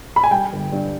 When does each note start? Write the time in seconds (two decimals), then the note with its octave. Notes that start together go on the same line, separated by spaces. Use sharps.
0.16 B5
0.24 G#5
0.31 G3 G5
0.52 G1
0.72 G2